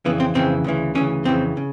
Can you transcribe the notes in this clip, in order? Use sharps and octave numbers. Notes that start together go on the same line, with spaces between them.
F2 C#3 E3 B3
C4
F2 C#3 E3 C4
D2 C#3 E3
D2 C#3 E3 C#4
F2 C#3 E3 C4
C#3